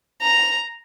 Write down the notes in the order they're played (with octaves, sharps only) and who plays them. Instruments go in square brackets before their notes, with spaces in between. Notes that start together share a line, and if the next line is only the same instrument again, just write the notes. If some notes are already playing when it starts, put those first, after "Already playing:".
[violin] A#5